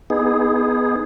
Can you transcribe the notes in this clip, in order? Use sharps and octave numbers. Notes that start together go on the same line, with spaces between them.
B3 D#4 G#4